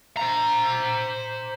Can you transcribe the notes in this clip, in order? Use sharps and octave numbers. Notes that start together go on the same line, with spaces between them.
C5 A#5